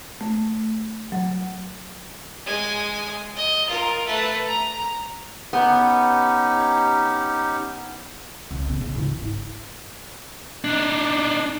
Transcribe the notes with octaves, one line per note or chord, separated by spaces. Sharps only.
A3
F#3
G#3 G#5
D#5
F4 A#4
A3 B4
A#5
B3 C#4 D#4 G4
C#2
A1 B3
C#3
G#2 F4
E3
E4
D4 D#4